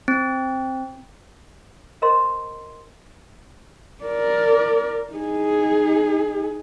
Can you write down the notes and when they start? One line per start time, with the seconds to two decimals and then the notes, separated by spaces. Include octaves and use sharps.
0.08 C4
2.02 A#4 C5 D#5 A#5 C6
4.04 A#4 D5
5.13 D#4 G#4